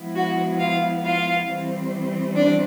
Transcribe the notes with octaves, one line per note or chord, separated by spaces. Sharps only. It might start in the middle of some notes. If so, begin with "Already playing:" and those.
Already playing: F3 G#3 B3 E4
F#4 F#5
F4 F5
F4 F5
E3 G3 C4
D4 D5